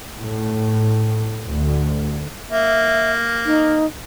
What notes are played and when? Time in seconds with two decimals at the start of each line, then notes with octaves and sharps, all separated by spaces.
0.16 A2
1.46 D2
2.51 A#3 E5
3.46 D#4